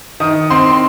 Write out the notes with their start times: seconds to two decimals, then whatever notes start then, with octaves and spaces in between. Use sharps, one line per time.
0.20 D#3 D#6
0.50 C4 C6